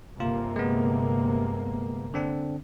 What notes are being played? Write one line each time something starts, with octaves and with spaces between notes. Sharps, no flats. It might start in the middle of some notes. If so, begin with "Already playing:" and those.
G1 C3 A#3 F4
G#3 B3
D3 C4 D4